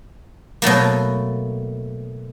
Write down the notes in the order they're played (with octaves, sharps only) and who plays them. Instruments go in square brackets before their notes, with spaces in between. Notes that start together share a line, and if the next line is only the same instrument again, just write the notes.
[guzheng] B2 F#3 A3 A#3